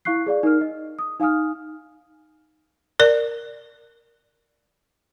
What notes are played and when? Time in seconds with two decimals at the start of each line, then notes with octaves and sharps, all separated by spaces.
0.05 E4 F5 C#6 F#6 C7
0.26 G#4 D5 F5
0.43 D#4 A#4 F6
0.61 D#5
0.99 D#6
1.20 D#4 F5 G#5 D#6 F6
3.00 A#4 D5